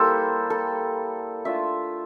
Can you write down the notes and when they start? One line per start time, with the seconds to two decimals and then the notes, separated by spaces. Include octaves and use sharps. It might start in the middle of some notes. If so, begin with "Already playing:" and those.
Already playing: G3 A#3 E4 A4 C5
0.50 A4
1.45 A3 D4 F4 E5